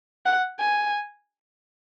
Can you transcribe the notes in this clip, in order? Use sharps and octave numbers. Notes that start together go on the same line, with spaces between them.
F#5
G#5